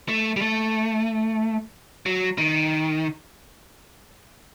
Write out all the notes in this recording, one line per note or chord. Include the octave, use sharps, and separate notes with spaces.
A3
G3
A3
F#3
D#3